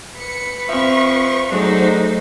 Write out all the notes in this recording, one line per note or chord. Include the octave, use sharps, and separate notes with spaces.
B4 C#7
F3 C4 E5 C#6
F#3 A3 D4 D#4 G#4 A4 C5